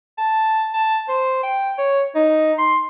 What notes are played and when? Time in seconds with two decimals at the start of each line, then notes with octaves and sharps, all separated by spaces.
0.18 A5
0.73 A5
1.09 C5
1.43 G5
1.78 C#5
2.15 D#4
2.58 C6